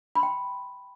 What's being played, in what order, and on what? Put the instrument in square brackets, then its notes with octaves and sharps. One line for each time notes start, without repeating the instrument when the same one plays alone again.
[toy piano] B5
C6
G5